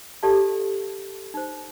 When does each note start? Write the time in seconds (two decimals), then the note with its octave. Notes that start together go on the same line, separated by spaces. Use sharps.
0.23 G4 A4 D5 F5 A5
1.34 D#4 C5